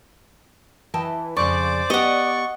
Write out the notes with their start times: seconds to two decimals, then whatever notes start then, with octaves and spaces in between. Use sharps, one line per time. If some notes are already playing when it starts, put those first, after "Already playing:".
0.94 E3 D#5 G5 A5
1.37 F2 C#3 C5 D5 C#6 D6
1.90 B3 G4 D#5 F#5 C#6